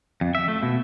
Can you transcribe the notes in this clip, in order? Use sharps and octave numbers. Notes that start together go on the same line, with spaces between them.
F2
E5
A3
B2